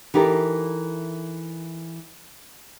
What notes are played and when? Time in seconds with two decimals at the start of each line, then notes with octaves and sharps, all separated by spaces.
0.14 E3 D#4 G4 A4 A#4